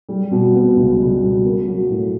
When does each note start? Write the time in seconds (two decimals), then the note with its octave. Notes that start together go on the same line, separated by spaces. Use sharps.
0.09 G3
0.31 B2
0.55 B3
0.77 C#2
0.99 G3
1.22 B2
1.45 A#3
1.68 F#3
1.90 A2